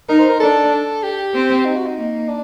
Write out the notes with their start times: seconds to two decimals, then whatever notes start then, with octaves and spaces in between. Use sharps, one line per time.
0.09 D#4 A#4
0.19 C5
0.29 A#4
0.40 D4 A4
1.03 G4
1.34 C4
1.65 D#4
1.76 F#4
1.87 D#4
1.97 A#3
2.28 D4